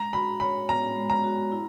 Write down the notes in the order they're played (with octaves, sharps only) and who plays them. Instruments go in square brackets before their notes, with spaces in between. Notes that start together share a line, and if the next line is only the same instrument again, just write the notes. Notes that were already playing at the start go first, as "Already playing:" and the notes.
Already playing: [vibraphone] G#3 [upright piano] A#5
[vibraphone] F#4 [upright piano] B5
[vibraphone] C#5 [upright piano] B5
[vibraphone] B3 [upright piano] A#5
[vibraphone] G#3
[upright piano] A#5
[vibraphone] F#4
E4